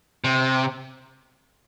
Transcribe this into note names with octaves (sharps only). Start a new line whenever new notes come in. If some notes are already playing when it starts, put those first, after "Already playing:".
C3